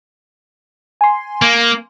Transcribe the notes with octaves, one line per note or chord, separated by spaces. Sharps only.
G#5 C6
A#3